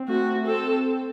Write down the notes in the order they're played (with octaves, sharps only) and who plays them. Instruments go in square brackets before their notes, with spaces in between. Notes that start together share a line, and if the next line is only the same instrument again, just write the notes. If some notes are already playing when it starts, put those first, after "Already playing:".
Already playing: [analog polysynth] C4
[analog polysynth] A3 [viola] F#4
[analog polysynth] C4 [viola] A4